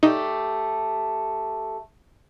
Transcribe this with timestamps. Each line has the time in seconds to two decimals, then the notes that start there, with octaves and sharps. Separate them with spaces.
0.03 A3 D#4 G4